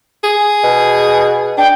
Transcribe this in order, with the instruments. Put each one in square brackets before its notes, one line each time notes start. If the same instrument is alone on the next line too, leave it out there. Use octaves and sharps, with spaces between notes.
[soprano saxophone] G#4
[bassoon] B2
[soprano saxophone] D4 [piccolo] G5